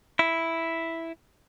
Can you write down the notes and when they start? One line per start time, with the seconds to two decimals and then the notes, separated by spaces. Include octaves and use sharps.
0.19 E4